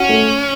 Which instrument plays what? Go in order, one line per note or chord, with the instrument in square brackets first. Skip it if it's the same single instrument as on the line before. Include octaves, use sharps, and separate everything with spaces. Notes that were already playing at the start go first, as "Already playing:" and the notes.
Already playing: [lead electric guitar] C#4 [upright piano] F#4
[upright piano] A3